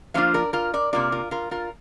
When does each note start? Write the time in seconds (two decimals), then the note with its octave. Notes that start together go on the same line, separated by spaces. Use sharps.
0.14 F3 A#3 D4 F4 C5 F5
0.34 A#4 D5
0.53 F4 A#4
0.74 A#4 D5
0.93 C3 A#3 F4 A#4 D5
1.12 F4 A#4
1.31 F4 A#4
1.51 F4 A#4